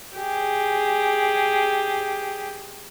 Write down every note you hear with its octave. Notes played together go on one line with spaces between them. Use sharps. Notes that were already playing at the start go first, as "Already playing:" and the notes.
G4 G#4